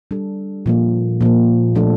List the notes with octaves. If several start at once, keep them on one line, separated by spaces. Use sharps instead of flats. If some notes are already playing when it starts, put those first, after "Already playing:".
G3 D4 A4
A#2 F3 A#3
A#2 F3 A#3
F3 A3 D4 A4